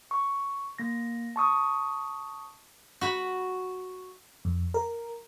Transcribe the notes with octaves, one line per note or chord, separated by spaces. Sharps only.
C#6
A#3 A#6
A5 C#6 D#6
F#4 B5
F2
A#4